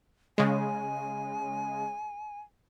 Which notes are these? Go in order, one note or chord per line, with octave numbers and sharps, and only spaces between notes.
C#3 G#3 G#5